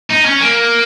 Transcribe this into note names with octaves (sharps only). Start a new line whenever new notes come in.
D#4
C#4
A#3